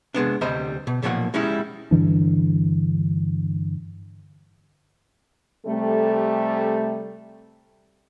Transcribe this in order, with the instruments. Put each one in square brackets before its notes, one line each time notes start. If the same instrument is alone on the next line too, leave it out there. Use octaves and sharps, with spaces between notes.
[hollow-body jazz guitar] C3 G#3 B3 D4
D2 C3 G3 C5 D#5 B5
B2
B1 A#2 F3 A#3 C#5 F#5
G3 G#3 C#4 D#4 E4
[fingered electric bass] G2 D3 E3 D4
[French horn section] C3 G3 A3